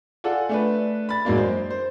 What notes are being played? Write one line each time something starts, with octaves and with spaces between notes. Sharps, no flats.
F4 A4 D5 F#5 G#5
A3 D4 B4
B5 A6
F#2 F#3 G#3 A#3 D4
C5
C5